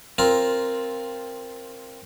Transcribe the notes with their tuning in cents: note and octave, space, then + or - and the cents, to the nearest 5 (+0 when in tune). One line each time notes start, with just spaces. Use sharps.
C4 +10 F4 +0 A#4 +0